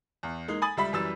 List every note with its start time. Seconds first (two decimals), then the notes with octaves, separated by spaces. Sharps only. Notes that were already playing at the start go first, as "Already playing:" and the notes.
0.23 E2
0.48 G#3 A#3 D#4
0.62 G#5 B5 D#6 A6 F#7
0.77 C#2 G3 E5 B5 B6
0.92 F#2 E3 G3 E6 A6